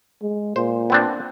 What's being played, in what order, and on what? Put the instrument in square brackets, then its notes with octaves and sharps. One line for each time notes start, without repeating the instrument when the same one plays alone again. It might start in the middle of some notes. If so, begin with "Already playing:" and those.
[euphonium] G#3
[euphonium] A#2 [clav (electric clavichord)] C5
[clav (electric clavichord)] B3 C4 D4